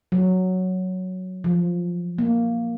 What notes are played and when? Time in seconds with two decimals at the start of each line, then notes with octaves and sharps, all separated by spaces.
0.12 F#3
1.44 F3
2.18 A#3